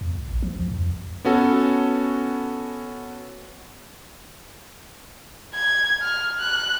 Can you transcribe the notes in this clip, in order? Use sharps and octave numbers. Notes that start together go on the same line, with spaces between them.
E2
C#2
A1
F3
D2
F2
B3 C#4 F#4 A4
G#6
F6
F#6